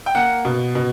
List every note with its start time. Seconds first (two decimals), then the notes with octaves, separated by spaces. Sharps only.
0.06 G5
0.15 A#3 F#5
0.45 B2
0.75 B2